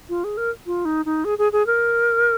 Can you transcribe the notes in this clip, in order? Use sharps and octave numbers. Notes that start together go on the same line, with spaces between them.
F4
G#4
A#4
F4
D#4
D#4
G#4
G#4
G#4
A#4